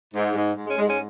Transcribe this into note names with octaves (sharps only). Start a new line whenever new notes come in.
G#2
G#2
G#2
G#3 C#4
G#2 G#3
G#3 C#4